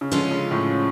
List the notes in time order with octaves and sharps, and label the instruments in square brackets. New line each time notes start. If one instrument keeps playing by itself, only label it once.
[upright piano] C#3
[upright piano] D3 [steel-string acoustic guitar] F3 G#3 C#4 F4
[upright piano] C#3
A2